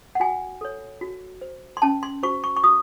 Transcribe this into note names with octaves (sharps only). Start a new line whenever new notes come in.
F#5
F#4 G#5
A4 C#5
F#4
C5
C6
C#4 A5
C6
F#4 C5 C#6
C#6
C#6
F#4 D#6